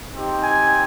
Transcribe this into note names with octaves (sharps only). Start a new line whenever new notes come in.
C4 D#4 G4
G#5